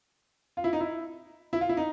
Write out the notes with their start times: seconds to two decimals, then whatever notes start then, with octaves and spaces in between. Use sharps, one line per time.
0.57 F4
0.64 E4
0.73 D#4
0.80 E4
1.53 E4
1.61 F4
1.69 E4
1.77 D#4